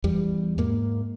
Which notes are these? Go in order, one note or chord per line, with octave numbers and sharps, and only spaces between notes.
E2 G3
G#2 A#3